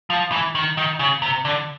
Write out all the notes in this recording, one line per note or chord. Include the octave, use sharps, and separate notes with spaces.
F3
E3
D#3
D#3
C#3
C3
D3